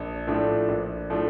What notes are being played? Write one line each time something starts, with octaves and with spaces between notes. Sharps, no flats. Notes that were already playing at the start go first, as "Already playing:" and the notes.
Already playing: A#1
A2 F3 A3 D4
A#1
A2 F3 A3 D4